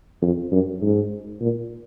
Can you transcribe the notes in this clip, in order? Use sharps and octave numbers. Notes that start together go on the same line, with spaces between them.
F2
F#2
G#2
A#2